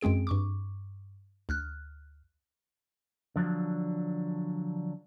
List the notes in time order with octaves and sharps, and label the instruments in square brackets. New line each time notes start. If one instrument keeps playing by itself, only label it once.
[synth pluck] F#2 G#3 C4 G#4 D7
G2 C#6 D6
D2 F6 F#6
[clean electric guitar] D3 F3 F#3 D4